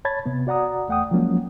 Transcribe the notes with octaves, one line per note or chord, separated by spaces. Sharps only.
C#5 A5 B5 G#6 A6
C3 B3
F#4 D5 F#5 A#5 D#6
E2 A3 F#5 G5 D#6
F3 F#3 G#3 A#3 C#4